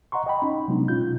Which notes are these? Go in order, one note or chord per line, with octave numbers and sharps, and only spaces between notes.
D#5 F#5 A#5 C6 C#6
D#5 G5 B5
C#4 D#4
C3 F#3 G#3 B3 D4 D#4
B2 C#4 F4 G6